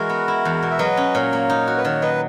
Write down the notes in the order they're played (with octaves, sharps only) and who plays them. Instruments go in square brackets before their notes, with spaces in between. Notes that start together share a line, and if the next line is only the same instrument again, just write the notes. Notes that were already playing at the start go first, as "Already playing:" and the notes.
Already playing: [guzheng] E3 G#3 [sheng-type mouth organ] F#4 A#4
[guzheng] B3
E4
E2
B2
[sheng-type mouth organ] E5
[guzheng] F#3 [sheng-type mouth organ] B4 D#5
[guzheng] C#4
[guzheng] A#2 [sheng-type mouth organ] A#4 C#5
[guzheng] A#3
D#4
F#4
[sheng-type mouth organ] B4
[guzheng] D#3 [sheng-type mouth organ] A#4 C#5
[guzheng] F#3 [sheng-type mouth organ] B4 D#5